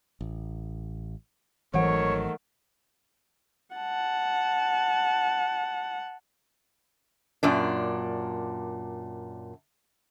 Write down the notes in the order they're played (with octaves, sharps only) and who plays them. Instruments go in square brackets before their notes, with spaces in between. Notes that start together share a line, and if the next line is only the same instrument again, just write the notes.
[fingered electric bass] A1
[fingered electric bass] G#1 F#3 [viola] D#3 A3 [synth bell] E3 F#5 [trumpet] C#5
[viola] F#5 A5
[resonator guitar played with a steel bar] F#2 A#2 D4